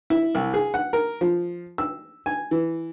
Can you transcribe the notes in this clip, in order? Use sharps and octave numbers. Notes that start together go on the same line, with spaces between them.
E4
C2
G#4
F#5
A#4
F3
E6
G#5
E3